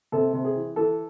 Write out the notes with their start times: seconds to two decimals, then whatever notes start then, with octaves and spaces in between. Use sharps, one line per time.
0.12 C3 A4
0.33 C3
0.45 G#4
0.55 E3
0.76 E3 A4